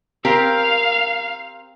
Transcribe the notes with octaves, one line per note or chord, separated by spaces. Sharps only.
C4 G4 A#4 F5